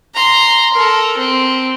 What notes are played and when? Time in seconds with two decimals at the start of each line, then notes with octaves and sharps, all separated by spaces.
0.14 A#5 C6
0.74 A4 A#4
1.17 C4